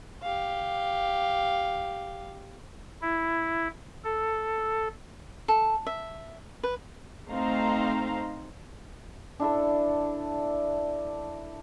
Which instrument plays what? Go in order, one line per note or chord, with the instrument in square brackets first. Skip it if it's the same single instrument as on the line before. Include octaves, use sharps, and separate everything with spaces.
[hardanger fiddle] G4 F5
[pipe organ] E4
A4
[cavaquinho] A4
E5
B4
[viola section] A3 C4 D#4 C5 F5 A#5
[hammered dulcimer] D4 E4 A4